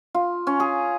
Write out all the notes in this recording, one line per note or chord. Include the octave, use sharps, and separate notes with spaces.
F4
C#4
G#4